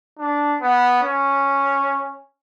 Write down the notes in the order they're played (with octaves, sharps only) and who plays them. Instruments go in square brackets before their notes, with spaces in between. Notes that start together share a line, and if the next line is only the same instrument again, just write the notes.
[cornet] D4
B3
C#4